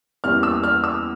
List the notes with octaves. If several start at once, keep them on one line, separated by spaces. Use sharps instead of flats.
E2 E3 G3 A#3 C#4 F6
E6
F6
E6